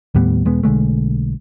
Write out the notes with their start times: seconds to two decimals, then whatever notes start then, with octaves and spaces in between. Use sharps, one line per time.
0.15 D#2 A2 G3 B3
0.45 E1 G#3 B3
0.63 B1 D3 G#3 A3